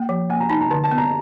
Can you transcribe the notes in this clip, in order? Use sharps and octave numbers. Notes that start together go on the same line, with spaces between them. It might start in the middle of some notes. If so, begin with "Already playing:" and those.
Already playing: A#3 G5
F3
A#3 G#5
A#5
D#4 A5
A#5
D3 A5
A5
B3
A#5